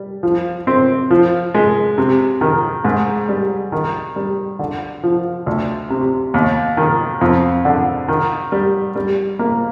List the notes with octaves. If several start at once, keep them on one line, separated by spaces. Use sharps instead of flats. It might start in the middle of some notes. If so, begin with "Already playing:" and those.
Already playing: G3
F3
C4
F3
G#3
C3
D#3
G#2
G3
D#3
G3
D3
F3
D2
C3
D#2
D#3
F2
D3
D#3
G3
G3
A#3